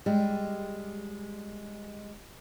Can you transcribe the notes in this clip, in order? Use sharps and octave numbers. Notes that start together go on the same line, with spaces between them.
G3 G#3